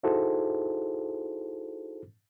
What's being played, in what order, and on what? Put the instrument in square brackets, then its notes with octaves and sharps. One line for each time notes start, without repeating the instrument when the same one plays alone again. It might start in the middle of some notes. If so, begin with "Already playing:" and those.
[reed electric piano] D#4 E4 F#4 G#4 A4 C5